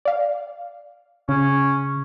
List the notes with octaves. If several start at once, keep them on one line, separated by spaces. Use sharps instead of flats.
D5 F5
C#3 C#4